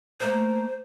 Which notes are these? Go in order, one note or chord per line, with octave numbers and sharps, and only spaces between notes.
A3 A#3 C5 F5